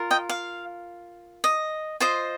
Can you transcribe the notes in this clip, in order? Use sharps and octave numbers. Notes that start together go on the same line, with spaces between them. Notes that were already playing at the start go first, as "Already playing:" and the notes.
Already playing: F4 A#4
D#5 G5
F5
D#5
F4 C5 D#5